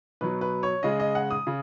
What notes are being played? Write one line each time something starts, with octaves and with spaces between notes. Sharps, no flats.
B2 F#3 B4
B4
C#5
C#3 G#3 D#5
D#5
F#5
D#6
C#3